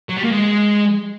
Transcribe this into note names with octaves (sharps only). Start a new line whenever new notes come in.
F#3
G3
A#3
G#3